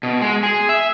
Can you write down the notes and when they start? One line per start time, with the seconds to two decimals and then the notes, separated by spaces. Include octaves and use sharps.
0.03 B2
0.22 G#3
0.43 G#4
0.69 E5